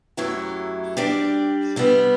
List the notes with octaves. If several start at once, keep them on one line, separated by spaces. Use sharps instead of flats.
F#2 F#3 A3 E4 G4
G3 D4 G4 D5
C3 G3 B3